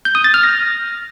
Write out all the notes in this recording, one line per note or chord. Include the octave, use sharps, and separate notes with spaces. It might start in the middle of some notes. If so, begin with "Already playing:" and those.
G6
D#6
A6
F6
A#6